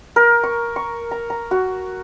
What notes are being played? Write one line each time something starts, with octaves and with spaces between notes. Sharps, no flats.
A#4
C#6
C#6
A#5
A#5
F#4